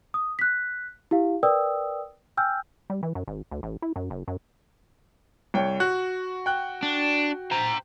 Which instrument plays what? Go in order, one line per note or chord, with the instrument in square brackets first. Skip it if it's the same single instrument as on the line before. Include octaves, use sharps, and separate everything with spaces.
[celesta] D#6
F#6 B6
E4 G4 F5
A#4 B4 D5 G5 D#6 E6
G5 G#5 E6 F6 G6
[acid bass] G3
E3
F#2
G#1
D2
A1
E4
F#2
F#1
F#2
[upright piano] C2 C#5 G5
[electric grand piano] F#4 [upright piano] F#6
[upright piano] G5 F#6
[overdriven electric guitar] D4
C5 A#5